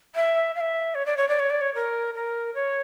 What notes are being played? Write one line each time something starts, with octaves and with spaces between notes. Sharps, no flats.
E5
F5
E5
C#5
D5
C#5
D5
C#5
D5
C#5
A#4
A#4
C#5